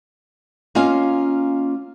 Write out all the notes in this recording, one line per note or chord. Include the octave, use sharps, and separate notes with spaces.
A#3 C#4 F4 D#5 F5